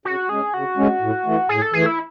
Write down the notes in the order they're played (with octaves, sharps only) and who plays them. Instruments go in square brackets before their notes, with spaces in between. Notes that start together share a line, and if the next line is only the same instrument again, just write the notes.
[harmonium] C#3 [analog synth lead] F#4
[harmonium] G#3 C#4 [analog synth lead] G#4
[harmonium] C#3 [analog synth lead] F#4
[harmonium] G#3 C#4
A2
E3 A3
[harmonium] A2 [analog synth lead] G#4
[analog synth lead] A4
[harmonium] E3 A3 [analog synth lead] G#4
[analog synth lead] E4